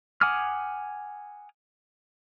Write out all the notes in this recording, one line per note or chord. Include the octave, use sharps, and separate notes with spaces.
F#5 G#5 D6 D#6 F6